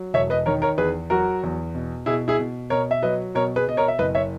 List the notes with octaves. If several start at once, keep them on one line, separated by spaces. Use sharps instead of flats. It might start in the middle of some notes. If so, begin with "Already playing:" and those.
Already playing: F#3
E1 C#5 E5
B4 D#5
D#3 A#4 C#5
A#4 C#5
E2 G#4 B4
F#3 F#4 A#4
E2
B2
B2 E4 G#4
E4 G#4
B2
B2 A#4 C#5
E5
F#3 B4 D#5
B2 A#4 C#5
G#4 B4
B2 D#5
A#4 C#5
E5
F#1 B4 D#5
C#5 E5